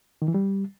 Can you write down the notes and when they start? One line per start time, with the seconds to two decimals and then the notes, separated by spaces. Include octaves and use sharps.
0.22 D#3
0.28 E3
0.34 G3